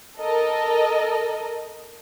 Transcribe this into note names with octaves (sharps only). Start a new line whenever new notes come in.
A4 A#4 D#5